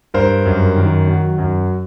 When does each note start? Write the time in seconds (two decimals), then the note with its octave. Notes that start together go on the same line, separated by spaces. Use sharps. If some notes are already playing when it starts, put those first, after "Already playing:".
0.14 G2 A#4 C5
0.46 F#2
0.76 D#3
1.07 F#3
1.38 F#2